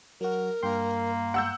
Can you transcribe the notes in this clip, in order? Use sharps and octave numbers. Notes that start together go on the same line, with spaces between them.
F#3 F#4 A#4
G2 A#3 G5 C6
F#5 E6 G6